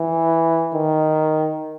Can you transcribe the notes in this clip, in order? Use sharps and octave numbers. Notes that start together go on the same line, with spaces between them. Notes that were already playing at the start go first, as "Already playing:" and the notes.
Already playing: E3
D#3